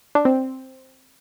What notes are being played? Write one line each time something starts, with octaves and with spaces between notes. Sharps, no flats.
D4
C4